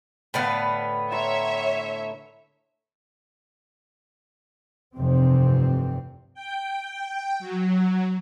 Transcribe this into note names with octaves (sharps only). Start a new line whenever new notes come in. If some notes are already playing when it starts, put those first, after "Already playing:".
A2 D3 B3 B4 F5 B5
C#5 E5 A#5 C6
F1 G2 C3 E3 C4
G5
F#3